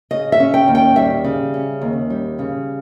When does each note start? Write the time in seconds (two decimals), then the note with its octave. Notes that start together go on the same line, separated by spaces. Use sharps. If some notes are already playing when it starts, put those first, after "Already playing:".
0.11 C#3 D#5
0.32 E5
0.40 C#4
0.54 G5
0.68 D#2
0.75 G5
0.96 G3 E5
1.24 C#3
1.54 C#4
1.82 D#2
2.10 G3
2.39 C#3